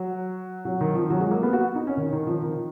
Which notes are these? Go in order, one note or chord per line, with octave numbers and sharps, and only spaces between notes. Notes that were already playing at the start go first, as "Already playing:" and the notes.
Already playing: F#3
F#3
D#3
F3
F#3
G#3
A#3
B3
F#4
D#4
C#4
D#3
D#3
F3
D#3